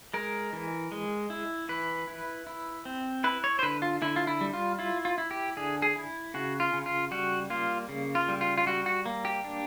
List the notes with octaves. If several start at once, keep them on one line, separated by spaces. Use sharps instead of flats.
G#3 A#4
E3
G#3
E4
E3 B4
E4
E4
C4
E4 B4
C#5
C5
D3 B4
F4
D3 E4
F4
E4
G3
F4
E4 F4
F4
E4
G4
D3 G#4
G#4
E4
C#3 F#4
F4
C#3
F4
G3 F#4
A#3 F4
C#3
F4
G3
F4
F4
G3 F#4
F#4
A#3
G4
D4